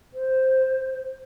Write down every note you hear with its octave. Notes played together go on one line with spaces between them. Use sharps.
C5